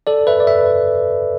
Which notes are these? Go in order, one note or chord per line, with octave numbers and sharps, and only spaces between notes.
A4 D5
B4 E5
D5
B4 E5